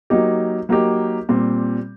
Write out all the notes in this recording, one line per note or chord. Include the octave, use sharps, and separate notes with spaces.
F#3 A#3 D#4 G4
F#3 A#3 D#4 G4
A#2 G3 C4